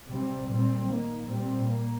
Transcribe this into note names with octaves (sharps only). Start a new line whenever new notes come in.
C3 G3 C4
A#2 G3 C4
D#3 A#3
A#2 G3 C4
A#3